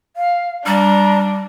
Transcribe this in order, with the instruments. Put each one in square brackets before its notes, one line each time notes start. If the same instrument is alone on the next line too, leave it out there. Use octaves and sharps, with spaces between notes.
[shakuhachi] F5
[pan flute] G3 [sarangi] D4 [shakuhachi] A#5